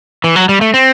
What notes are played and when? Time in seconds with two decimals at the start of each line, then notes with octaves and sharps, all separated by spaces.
0.24 E3
0.36 F#3
0.49 G3
0.61 A3
0.74 C4